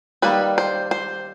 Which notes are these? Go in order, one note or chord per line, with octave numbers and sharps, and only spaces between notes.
D#3 G3 A#3 B4
C5
C5